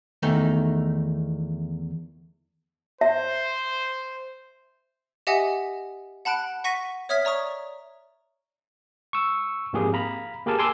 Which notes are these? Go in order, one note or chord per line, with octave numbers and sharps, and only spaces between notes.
E2 D#3 A3 D#4
C5 E5
G4 D#5 E5 F#5 G#5 D#6
F#5 A5 B5 F#6 D7
F#5 C#6 A#6 B6 D#7
C#5 E5 D#6 F6 G#6 B6
D5 A#5 C#6 D#6
C#6 E6
G#2 F3 A#3 C4 G4 G#4
F5 A#5 B5
A#3 G4 G#4 A#4 A5
G#5 A5 C6 D6 E6